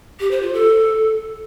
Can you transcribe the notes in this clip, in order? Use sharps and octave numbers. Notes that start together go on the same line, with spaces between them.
G4
C5
F4
A4